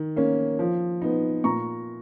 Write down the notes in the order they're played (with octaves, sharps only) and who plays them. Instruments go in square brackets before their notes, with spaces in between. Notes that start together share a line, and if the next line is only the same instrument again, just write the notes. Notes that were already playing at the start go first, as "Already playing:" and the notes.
Already playing: [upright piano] D#3
A#3 C#4
F3
B3 D#4
A#2 A#5 C#6